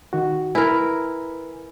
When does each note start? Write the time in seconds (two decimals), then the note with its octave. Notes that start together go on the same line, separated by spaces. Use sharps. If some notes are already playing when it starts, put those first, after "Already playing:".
0.13 D#3 F#4
0.55 E4 A#4 B4 G#5